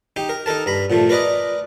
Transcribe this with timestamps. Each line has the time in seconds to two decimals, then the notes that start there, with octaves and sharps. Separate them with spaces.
0.16 D#4 G4
0.29 A#4
0.46 D#4 A4 A#4 A5
0.66 G2 A#5 B5
0.90 A#2 F3 A3
1.09 A#4 B4 D5 D#5 A#5